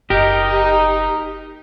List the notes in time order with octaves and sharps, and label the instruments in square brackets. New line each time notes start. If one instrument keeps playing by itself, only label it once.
[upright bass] F#1 [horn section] D#4 [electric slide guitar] G4 [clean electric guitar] A#4